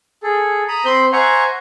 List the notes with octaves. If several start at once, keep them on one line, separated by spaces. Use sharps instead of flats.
G#4 A4
A#5 B5 D#6
C4 C5 B5 C6 G6
C5 E5 F#5 G#5 A#5 C#6